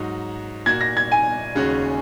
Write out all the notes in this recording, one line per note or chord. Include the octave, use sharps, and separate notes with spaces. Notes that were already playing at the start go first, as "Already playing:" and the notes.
Already playing: G#2 F#3 D#4 F#4
A#2 A#3 F#4 G#6
A#6
G#6
G#5
D#2 C#3 G#3 C#4 F#4